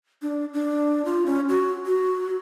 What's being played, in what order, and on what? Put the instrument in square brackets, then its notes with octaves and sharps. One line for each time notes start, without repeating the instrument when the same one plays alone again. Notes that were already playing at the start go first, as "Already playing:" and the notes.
[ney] D4
D4
F4
C#4
F#4
F#4